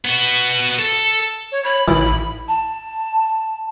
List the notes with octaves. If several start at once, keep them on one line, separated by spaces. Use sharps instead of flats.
B3 F#4
A4
C#5
C#5 B5
A1 D#3 E3 E4
A5